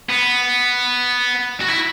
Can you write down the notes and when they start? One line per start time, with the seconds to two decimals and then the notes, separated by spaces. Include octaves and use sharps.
0.10 B3
1.60 F#4
1.69 E4